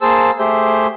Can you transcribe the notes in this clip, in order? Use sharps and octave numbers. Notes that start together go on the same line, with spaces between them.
A#3 G#4 C5 A5 E6
A3 G4 G#4 C5 E5 G6